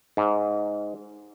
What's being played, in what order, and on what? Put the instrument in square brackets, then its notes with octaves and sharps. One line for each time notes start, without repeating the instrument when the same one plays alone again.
[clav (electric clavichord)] G#2